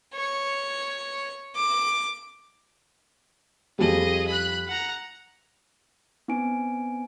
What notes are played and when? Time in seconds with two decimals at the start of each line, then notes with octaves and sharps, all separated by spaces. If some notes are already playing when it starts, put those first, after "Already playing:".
0.14 C#5
1.55 D6
3.79 F2 F3 G3 G#4 D#5
4.28 B5 F#6
4.68 F#5 A#5
6.28 B3 C4 D#4 G#5 D7